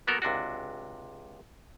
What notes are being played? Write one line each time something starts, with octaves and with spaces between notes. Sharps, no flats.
F#3 A#3 B3 F#4 A4 A#4
C#2 C3 D4 F#4